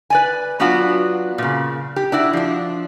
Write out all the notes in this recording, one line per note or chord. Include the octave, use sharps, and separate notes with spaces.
B4 D5 G#5
F#3 B3 D4 F4 F#4
A#2 C#3
G4
D4 E4 F#4
F3 D4